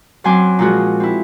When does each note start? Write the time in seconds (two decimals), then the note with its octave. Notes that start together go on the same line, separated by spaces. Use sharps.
0.24 F#2 F#3 C4 G#5 C6 D6
0.59 A#2 F3 G#3 F#4 G#4
1.00 C4 E4